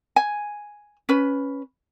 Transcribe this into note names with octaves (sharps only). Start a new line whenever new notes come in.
G#5
C#4 B4